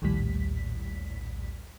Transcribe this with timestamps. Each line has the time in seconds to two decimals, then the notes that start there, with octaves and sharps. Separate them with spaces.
0.02 A#1 D#2 A2 G3 B6